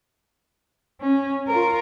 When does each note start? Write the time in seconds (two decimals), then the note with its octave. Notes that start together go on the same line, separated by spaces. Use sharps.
1.01 C#4
1.48 F4 A#4